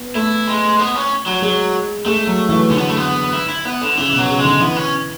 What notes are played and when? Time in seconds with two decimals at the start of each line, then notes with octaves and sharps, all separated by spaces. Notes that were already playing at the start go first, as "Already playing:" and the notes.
Already playing: B3
0.15 A3 E4
0.47 G#3
0.80 B3
0.95 C#4
1.26 F#3
1.42 F#3 G#3
2.06 G#3 A3
2.27 F#3
2.49 E3
2.70 D3 C#4
2.78 B3
2.88 A3
2.97 B3
3.33 E4
3.49 E4
3.65 B3
3.81 D3
3.97 C#3 E3
4.13 B2
4.18 F#3
4.28 C#3
4.39 G#3
4.45 D3
4.60 E3 B3
4.77 C#4